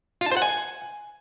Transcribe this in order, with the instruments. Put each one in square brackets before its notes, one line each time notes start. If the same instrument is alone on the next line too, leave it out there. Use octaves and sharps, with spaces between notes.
[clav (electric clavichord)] F4
A5
C5
F#5
G#5